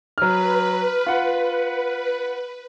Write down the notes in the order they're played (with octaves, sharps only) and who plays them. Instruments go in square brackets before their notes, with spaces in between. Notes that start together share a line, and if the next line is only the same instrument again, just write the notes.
[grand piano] F#3 F6 [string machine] B4
[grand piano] F4 F#5